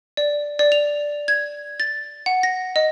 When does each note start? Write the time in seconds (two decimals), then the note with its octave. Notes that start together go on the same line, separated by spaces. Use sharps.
0.17 D5
0.59 D5
0.72 F7
1.28 G#6
1.80 A6
2.26 F#5
2.43 A#6
2.76 D#5